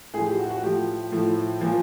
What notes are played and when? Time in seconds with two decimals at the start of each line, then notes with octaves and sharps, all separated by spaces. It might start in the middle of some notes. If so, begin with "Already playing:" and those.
0.14 A2 F3 G#4
0.26 G4
0.38 F#4
0.50 F#4
0.63 A2 F3 G4
1.12 A2 F3
1.61 A#2 F3